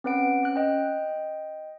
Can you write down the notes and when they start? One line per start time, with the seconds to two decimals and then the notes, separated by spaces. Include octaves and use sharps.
0.04 C4 C#4 B4 F#5 D7
0.43 C#4 F#6
0.56 D#5 G5